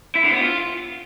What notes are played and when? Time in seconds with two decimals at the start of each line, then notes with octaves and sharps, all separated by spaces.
0.15 E4
0.24 D3
0.32 B3
0.40 F4